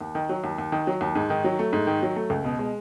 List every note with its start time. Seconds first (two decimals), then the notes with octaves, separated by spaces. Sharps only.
0.01 D#2
0.15 D#3
0.29 F#3
0.44 D#2
0.58 D#2
0.72 D#3
0.87 F#3
1.01 D#2
1.15 G#2
1.30 D#3
1.44 F#3
1.59 A3
1.73 G#2
1.87 D#3
2.02 F#3
2.16 A3
2.30 C#2
2.45 B2
2.59 G#3